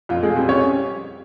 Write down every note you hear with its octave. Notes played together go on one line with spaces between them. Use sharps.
F2 F4
G#3 G#4
G3 C4 C5
C#4 C#5